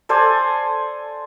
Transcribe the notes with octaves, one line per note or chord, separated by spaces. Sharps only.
A4 C5 D5 G#5